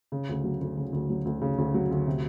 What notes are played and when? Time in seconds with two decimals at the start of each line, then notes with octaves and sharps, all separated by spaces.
0.12 C#3
0.29 D2
0.44 F#3
0.61 D2
0.78 C#3
0.93 D2
1.10 F#3
1.25 D2
1.42 C#3
1.58 D2
1.74 F#3
1.91 D2
2.07 C3